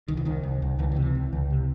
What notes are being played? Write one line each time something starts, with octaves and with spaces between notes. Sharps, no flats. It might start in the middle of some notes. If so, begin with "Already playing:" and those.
C2 D#3
E3
C2 D#3
C2
C2
C#2 E3
E3
C3
E3
C#2
C#2
C3